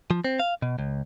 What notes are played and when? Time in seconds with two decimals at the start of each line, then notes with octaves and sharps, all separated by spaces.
0.11 F3
0.24 C4
0.40 F5
0.62 B2
0.79 C#2